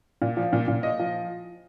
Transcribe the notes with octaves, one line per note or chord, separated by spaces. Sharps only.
A#2
F3
A#2
A#2
D#5
F3